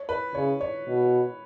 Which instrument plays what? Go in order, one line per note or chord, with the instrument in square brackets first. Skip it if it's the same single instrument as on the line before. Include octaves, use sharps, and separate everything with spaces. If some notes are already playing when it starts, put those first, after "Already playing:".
Already playing: [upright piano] C#5
B4
[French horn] C#3 [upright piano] C#5
[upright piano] C#5
[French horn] B2